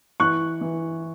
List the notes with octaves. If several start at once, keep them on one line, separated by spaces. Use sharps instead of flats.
E3 C#6 F#6
E3